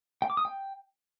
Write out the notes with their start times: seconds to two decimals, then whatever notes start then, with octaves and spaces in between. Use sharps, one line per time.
0.22 G5
0.30 D6
0.37 D#6
0.45 G5